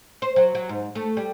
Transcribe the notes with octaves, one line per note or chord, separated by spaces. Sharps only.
C5
F#3
F#3
G#2
A3
G3